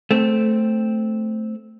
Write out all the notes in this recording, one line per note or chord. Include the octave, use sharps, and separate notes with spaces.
A3 C4